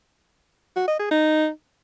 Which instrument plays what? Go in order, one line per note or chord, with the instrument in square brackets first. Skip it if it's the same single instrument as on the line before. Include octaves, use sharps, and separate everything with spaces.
[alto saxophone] F#4
D#5
G#4
D#4